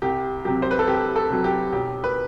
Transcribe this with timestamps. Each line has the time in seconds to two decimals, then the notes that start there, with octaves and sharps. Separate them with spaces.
0.02 C2 G4
0.45 C3 F#3 G4
0.62 C5
0.71 B4
0.79 A4
0.87 C2 G4
1.16 A4
1.30 C3 F#3
1.44 G4
1.72 B1 G4
2.04 B4